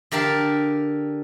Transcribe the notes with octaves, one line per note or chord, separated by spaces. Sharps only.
D3 G4 A#4 F5 A5